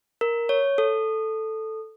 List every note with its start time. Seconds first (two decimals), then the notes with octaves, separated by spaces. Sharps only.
0.21 A#4
0.49 C#5
0.78 A4